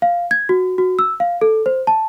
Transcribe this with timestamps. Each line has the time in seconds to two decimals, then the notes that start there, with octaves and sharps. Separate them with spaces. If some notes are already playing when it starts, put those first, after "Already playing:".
0.02 F5
0.31 G#6
0.49 F#4
0.78 F#4
0.99 E6
1.20 F5
1.41 A4
1.66 C5
1.87 A5